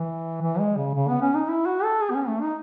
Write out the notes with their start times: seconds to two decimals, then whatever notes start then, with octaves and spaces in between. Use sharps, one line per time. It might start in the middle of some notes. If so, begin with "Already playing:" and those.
Already playing: E3
0.42 E3
0.59 G#3
0.77 C#3
0.95 C#3
1.08 B3
1.21 C#4
1.35 D#4
1.48 E4
1.66 F#4
1.84 A4
2.01 G#4
2.10 B3
2.15 C#4
2.28 A3
2.41 D#4